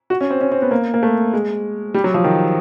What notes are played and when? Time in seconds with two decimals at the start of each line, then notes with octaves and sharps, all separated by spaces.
0.10 F#4
0.21 C#4
0.30 C4
0.41 C#4
0.52 C4
0.62 B3
0.71 A#3
0.94 A#3
1.03 A3
1.33 G#3
1.94 G3
2.04 F#3
2.14 F3
2.24 D#3